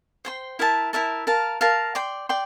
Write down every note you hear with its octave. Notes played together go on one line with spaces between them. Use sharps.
C5 G5 C6
E4 A#4 E5 A5
E4 A#4 E5 A5
A#4 F5 A5
A#4 F5 A5
D5 G5 C6
D5 G5 C6